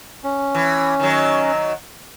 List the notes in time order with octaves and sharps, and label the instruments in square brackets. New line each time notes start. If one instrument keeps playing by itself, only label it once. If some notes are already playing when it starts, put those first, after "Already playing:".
[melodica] C#4
[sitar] E3
D#3 F#3